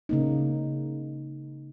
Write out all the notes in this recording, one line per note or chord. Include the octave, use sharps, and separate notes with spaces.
C#3 A#3 D#4